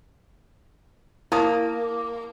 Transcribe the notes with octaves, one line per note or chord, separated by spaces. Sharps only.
A#3 E4 A5 D#6